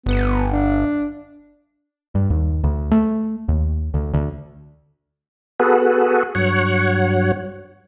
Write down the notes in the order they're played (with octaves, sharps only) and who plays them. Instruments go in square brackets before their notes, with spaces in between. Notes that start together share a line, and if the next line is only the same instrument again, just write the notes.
[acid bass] G1 [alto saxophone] B3
[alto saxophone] D4
[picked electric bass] G2
D#2
D2
A3
D#2
D2
D2
[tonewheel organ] B3 F#4 G#4 A4 B4
G2 F#3 C#5 F#5